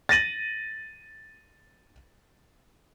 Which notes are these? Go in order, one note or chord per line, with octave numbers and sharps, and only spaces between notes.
A6 A#6 D#7 F#7